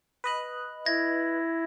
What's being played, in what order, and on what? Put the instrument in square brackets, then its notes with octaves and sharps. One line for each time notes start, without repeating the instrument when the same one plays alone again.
[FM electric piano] B4 D#5 F#6
[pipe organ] E4 [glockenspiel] G#6 A#6